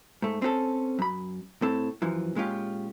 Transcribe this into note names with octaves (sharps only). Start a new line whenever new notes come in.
G#2 A3
C4 C#4 G4 A4
F#2 B5
A2 C4 A4
F#2 E3 F3
A#2 G#3 C#4 F4 G4